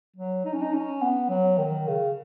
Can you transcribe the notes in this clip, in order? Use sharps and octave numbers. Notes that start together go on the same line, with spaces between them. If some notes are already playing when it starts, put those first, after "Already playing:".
F#3
D#4
C#4
D#4
C#4
B3
F#3
D#3
C#3